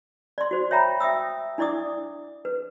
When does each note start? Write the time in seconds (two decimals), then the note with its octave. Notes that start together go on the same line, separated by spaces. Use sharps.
0.38 D5 C6
0.51 F#4 C5
0.71 C#5 E5 G5 A#5 B5
1.00 E5 G5 D#6 E6
1.58 D4 E4 D5 D6 D#6
2.45 B4